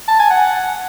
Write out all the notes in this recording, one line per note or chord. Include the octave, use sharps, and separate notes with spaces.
A5
G#5
F#5